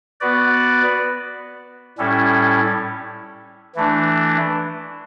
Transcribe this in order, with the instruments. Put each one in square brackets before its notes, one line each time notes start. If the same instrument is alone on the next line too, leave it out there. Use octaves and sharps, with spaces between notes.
[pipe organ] B3 F#4 B4 D5
A2 G3 C#4 E4 A4
E3 A3 D4